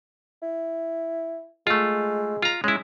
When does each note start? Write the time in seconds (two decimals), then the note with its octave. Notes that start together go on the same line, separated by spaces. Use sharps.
0.43 E4
1.67 G#3 A3 F4
2.42 F4 A#5
2.64 G#3 C#4 E4